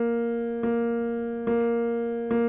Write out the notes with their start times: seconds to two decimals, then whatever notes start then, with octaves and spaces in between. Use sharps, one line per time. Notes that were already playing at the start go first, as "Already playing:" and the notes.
Already playing: A#3
0.63 A#3
1.47 A#3
2.31 A#3